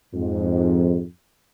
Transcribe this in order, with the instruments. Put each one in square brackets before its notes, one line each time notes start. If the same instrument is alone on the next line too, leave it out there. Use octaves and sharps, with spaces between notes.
[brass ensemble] F2 G#2